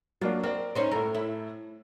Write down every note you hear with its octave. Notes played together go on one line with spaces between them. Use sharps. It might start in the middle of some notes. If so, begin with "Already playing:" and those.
F#3 A#3 D4 F4
C4 A#4 D5
C#4 D#4 C5
A2 A4 A#4
E4